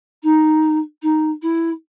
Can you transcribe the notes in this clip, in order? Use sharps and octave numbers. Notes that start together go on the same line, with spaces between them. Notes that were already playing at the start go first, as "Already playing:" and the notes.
D#4
D#4
E4